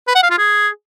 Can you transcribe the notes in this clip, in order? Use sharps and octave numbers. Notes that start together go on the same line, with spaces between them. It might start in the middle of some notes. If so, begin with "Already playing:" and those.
B4
F#5
F5
F4
G#4